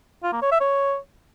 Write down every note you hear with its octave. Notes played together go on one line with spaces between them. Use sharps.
F4
A#3
C#5
E5
C#5